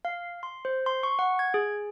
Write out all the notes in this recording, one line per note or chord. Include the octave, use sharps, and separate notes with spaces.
F5
C6
C5
C6
C#6
F#5
G#6
G#4